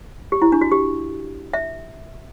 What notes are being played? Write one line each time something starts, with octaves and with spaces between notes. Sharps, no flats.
G4
E4
D4
F#4
G4
E5